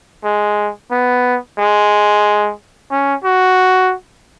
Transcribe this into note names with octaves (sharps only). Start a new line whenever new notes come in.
G#3
B3
G#3
C#4
F#4